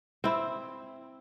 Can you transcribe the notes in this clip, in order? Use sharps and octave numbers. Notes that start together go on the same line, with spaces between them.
C4 E4